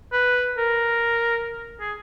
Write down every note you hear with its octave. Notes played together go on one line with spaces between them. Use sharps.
B4
A#4
G#4